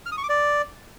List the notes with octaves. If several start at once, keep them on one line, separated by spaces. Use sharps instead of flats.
F6
D#6
C#6
D6
D5